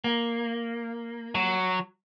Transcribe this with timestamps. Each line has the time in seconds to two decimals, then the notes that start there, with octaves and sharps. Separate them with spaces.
0.04 A#3
1.35 F#3